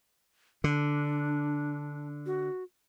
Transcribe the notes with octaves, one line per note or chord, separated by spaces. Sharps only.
D3 D4
F#4